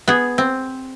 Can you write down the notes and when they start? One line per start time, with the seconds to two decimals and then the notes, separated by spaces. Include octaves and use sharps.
0.08 B3 G#4
0.38 C4